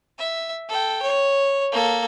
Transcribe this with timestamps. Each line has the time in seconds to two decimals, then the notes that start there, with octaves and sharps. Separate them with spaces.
0.18 E5
0.69 A4 G5
1.03 C#5
1.72 A#3 A4